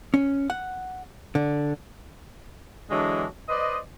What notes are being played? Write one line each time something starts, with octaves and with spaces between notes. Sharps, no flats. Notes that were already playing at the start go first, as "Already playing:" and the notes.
C#4
F#5
D3
D3 E3 F#3 G#3 D4
B4 C5 D5 D#5